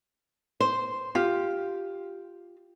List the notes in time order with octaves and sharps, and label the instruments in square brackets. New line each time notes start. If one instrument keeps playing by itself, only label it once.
[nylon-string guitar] C5
[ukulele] F4 [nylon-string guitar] G4